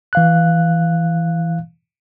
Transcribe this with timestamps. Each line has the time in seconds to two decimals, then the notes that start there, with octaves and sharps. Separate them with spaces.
0.13 E3 F5 F#6